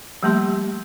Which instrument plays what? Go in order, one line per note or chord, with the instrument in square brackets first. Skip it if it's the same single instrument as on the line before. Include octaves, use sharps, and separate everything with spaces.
[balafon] F3 G3 A3 A#3 G4 C6